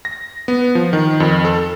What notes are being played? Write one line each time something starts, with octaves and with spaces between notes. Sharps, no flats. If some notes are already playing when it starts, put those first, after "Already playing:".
A#6
B3
F3
D#3
F2
A4